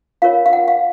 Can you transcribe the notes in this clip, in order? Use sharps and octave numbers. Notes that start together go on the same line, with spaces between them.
F4 A#4 C#5 F5
F5
F#5
F5